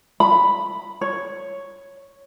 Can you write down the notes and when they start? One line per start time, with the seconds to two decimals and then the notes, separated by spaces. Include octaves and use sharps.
0.20 B5
1.01 C#5